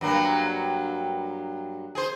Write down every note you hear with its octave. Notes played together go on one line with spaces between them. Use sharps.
G2 F#3 A#3
G#4 C5